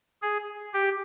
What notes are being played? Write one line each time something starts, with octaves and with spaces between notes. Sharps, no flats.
G#4
G4